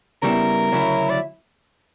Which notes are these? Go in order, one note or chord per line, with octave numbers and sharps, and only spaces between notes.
C#3 G3 B3 E4 A#4
D2 C#3 F#3 C#4 E4
D5